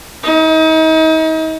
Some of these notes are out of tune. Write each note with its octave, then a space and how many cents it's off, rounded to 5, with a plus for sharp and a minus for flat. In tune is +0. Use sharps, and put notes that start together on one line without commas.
D#4 +40